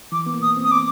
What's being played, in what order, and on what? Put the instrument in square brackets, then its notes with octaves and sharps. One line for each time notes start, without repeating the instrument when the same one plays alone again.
[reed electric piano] E3 [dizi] D6
[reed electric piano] B3
A#3
[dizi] D#6
[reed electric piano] C4
[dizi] D#6
D6